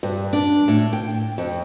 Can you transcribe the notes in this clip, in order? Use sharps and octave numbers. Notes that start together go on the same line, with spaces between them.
G2
D4
A2
G5
F2